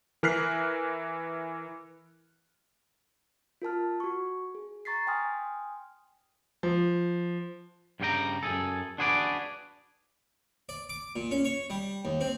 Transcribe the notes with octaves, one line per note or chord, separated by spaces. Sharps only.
E3 A#4 F6 F#6 B6 C7
F4 A#4 A5 F6
F#4 C#6
G#4
A#5 C#6 A6 B6 C7
G5 G#5 C6 D#6 F6
F3
G2 C#3 G3 F4 G5 A#5
F#2 C#3 G#4 A4
D4 F#4 G#4 B4 C5 D5
D5
D6
A#2
C#4
C#5
G3
D#2
C4